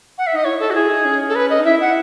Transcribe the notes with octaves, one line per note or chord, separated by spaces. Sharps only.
F#5
E5
D#4 D#5
E4 C#5
A4
F#4
E4 G#4
D#4
C#4
A4
B4
D#5
D#4
E4 E5
F#5